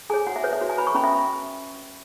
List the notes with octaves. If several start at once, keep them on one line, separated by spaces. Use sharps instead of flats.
G#4 C#5 G#5
F#4 F#5
E5
B4 C#5
E5
F#4
G#5
B4 B5
C#6
C#4 B5
E5